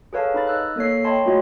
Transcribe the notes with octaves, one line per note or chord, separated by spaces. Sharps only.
G#4 A4 B4 C#5 F5 A5
D#4 B5 A6
D#5 E6 F#6
A#3 A4 C#5 C7
C#5 D#5 G5 A5 B5 C6
A3 F4 F#4 G#4 C#5 D#5